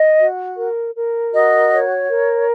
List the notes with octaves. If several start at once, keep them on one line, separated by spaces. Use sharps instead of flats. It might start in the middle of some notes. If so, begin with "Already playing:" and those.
Already playing: D#5
F#4
A#4
A#4
F#4 D#5
C#5
A#4